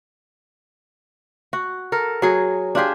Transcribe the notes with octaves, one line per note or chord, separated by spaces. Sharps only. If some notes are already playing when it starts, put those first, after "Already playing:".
F#4
A4 A#4
F#3 G#4
D4 F4 G4 G#4